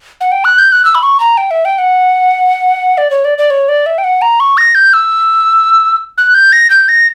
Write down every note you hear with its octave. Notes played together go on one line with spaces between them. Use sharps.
F#5
G5
F#6
G6
F#6
E6
B5
C#6
A#5
G5
E5
G5
F#5
D5
C#5
D5
D5
C#5
D5
E5
G5
F#5
A#5
C#6
A#6
G6
E6
F#6
G6
A#6
G6
A#6